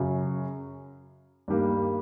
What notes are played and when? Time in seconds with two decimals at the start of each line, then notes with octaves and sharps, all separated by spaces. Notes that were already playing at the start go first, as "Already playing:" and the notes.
Already playing: F#2 C#3 F#3
1.48 G2 D#3 G3 A#3